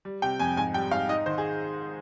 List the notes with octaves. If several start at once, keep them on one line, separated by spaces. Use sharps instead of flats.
G3
C3 G5
F2 G#5
G#2 G#5
G3 G5
G#2 F5
D#4 D#5
D#3 C5
G#4